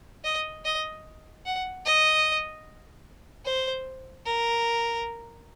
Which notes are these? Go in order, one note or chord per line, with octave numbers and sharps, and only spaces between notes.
D#5
D#5
F#5
D#5
C5
A#4